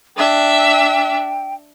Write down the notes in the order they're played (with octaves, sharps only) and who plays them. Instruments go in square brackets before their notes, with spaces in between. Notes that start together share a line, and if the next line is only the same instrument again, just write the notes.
[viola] D4 E5 [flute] G5